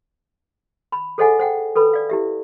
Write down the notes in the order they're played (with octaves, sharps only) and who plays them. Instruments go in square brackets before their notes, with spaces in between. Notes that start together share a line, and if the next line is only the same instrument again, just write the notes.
[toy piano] B5
G#4 A4 C5 D#5 F#5 G#5
C5 F#5 G5
A4 B4 B5
D5 F5
E4 G4 E5